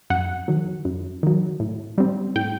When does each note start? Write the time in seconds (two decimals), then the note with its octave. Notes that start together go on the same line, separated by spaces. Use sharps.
0.10 F#2 F#5
0.48 D#3 F#3
0.85 F#2
1.23 D#3 F#3
1.60 A2
1.98 G3 C4
2.35 A2 G5